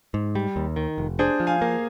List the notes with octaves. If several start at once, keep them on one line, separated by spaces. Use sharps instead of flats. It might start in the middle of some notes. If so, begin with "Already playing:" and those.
G#2
G3
D#2
D#3
F1
D4 G#4 C5
F3
F5 G#5
A#3